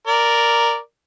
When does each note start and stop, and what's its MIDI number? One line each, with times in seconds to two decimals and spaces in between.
0.07 0.78 70
0.07 0.78 74